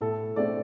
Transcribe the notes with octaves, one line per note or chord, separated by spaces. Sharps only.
A2 A4
A3 C4 D5